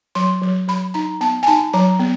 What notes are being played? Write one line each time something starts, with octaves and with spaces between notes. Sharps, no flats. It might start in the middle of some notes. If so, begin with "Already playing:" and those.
F#3 C6
F#3
F#3 B5
D#4 A#5
B3 A5
G#5
D#4 A5
F#3 A#5
B3